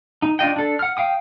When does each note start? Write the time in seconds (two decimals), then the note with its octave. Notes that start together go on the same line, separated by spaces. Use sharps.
0.22 D#4
0.39 D4 F4 D#5 G5
0.56 D4 A4
0.79 F#5 F6
0.97 F5 G5 D#6